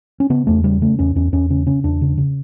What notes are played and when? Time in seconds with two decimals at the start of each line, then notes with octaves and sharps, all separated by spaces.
0.20 C#4
0.30 C#3 B3
0.47 E2 A3
0.64 C#3 G3
0.82 C#3 A3
0.99 E2 C#4
1.15 E2 C#4
1.32 E2 C#4
1.50 C#3 C#4
1.67 C#3 C#4
1.84 E2 D4
2.01 C#3
2.18 C#3